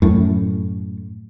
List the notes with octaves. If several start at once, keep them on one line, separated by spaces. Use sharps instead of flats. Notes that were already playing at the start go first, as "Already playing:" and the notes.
F#2 A2